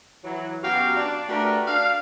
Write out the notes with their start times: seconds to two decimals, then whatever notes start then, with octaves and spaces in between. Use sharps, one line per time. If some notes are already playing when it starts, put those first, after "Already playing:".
0.24 E3 F#3
0.64 F#2 B3 F#4 G4 A#4 F5
0.96 D4
1.29 A3 D4 F#4 G4 A#4 B4
1.67 D4 F5